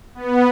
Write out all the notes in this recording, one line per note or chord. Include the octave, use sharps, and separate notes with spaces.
B3